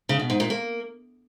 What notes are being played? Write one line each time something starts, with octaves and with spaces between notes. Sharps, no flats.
C#3
B2
G#2
A#2
A#3